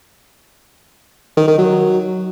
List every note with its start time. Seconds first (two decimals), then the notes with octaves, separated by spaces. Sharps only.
1.37 D#3
1.48 D#3
1.58 F#3